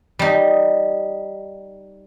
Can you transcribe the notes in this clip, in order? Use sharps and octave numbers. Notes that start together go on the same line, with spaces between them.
G3 D#4